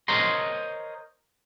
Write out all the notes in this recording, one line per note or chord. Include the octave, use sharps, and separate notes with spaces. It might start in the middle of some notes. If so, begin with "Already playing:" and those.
A#4 C5 C#5 D#5 A#5 C6